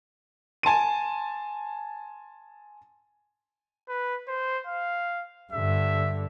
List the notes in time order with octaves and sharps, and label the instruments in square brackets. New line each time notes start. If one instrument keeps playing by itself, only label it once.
[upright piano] G#5 A5 C6 D#7
[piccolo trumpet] B4
C5
F5
[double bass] G2 D3 [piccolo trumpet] E5